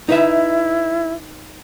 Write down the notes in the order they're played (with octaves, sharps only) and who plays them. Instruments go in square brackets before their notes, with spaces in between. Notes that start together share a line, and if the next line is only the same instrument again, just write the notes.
[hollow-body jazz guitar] D#4 B4 E5 [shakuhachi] E4